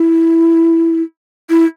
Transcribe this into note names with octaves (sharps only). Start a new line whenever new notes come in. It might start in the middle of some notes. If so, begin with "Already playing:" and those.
Already playing: E4
E4